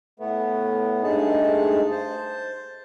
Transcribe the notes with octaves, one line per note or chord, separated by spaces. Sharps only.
A2 A3 B3
G2 G#3 A3 D#4 G#4 A5
C5 A5